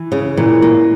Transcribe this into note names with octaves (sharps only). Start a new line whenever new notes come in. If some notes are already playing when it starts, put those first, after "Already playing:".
Already playing: E3
C#3
A#2 E3
A#3